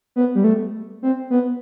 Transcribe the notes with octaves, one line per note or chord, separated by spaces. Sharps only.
B3
G3
A3
C4
B3